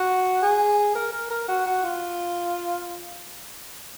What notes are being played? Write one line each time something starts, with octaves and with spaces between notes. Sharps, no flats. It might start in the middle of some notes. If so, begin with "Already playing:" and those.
Already playing: F#4
G#4
A#4
A#4
A#4
F#4
F#4
F4